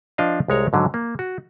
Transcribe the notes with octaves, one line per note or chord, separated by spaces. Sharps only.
F3 D4 D#5 F5
C2 G#3 C#5 A#5
G#2 D3 F#3
A#3
F#4